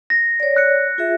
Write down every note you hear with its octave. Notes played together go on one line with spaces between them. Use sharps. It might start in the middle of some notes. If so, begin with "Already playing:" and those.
A#6
C#5 D5
F#6 C#7
F4 G#4 E5